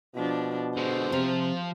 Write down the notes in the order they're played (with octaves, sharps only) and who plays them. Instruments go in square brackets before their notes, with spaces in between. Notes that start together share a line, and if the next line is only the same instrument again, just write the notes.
[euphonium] B2 [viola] F3 D4
[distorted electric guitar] D3 G#3 [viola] C5
[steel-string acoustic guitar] C3 [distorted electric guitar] F3 F4